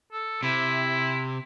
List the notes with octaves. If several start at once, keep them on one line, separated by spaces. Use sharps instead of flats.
A4
C3 E4